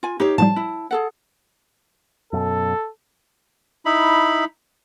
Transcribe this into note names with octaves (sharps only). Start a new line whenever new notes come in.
F4 G#5
D#4 G4 C#5 F5
A2 F3 G3 A5
E4
G#4 A4 F#5
F#2 B2 A4
D#4 E4 B5